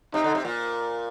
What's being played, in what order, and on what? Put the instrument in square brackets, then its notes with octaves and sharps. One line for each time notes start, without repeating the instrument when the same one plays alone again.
[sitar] C3 [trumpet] D#4
[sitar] D3
C3
A#2